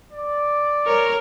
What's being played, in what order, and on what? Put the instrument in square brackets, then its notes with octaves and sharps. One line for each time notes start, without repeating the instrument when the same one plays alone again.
[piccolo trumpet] D5
[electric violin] A#4 C#5